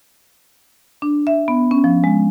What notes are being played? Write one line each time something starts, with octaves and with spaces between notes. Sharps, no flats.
D4
E5
B3
C#4
F3
G#3